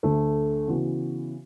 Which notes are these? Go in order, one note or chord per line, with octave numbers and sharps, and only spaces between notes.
D2 D3 A3
C#3 E3 B3 F#4